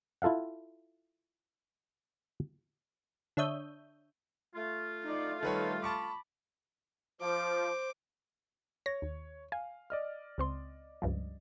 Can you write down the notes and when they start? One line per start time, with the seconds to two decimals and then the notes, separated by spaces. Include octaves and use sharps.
0.22 E4 F4 A4 F5 F#5
3.37 D3 D4 C#5 E5 D#6 G6
4.55 A3 F4
5.04 D#4 D5
5.43 D#3 G3 A4 B4 C#5
5.82 A5 B5 C#6 D6
7.21 F3 C5 D6
8.86 C#5 A#6
9.02 D#2
9.52 F5 G#5
9.90 D5 D#5 F6
10.38 C#2 C4 C6
11.02 C#2 G2 F3